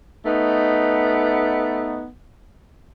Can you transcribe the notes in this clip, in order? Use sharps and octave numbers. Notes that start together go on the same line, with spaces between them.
A3 B3 D#4